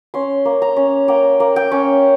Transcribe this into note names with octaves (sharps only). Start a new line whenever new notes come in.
C#4 C6
A#3
A#5
C#4
A#3 G5
A#3
G5
C#4